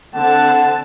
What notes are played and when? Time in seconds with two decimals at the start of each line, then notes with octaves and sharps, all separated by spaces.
0.15 D3 C4 F#5 A5